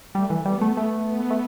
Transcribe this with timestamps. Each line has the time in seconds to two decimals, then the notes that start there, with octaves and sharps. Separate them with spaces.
0.14 G3 A3
0.30 E3
0.45 G3 B3
0.61 A3
0.77 A3
1.08 B3
1.30 A3